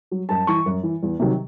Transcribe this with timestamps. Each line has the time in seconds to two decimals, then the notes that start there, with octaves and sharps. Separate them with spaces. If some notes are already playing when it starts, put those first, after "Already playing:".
0.11 F#3
0.29 F#2 A5
0.47 E3 C#6
0.66 F#2
0.83 E3
1.03 E2
1.20 C3 D#3 F#3